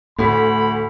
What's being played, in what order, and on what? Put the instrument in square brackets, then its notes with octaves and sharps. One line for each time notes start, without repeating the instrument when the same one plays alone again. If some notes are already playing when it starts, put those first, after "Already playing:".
[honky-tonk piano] D2 [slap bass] A2 [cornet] B5